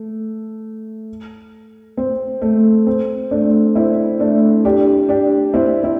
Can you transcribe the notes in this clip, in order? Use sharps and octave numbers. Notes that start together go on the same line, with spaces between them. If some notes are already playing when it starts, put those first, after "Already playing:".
Already playing: A3
C4
A3
C4
A3 D4
C4 E4
A3 D4
D4 G4
D4 G4
C4 E4
C4 E4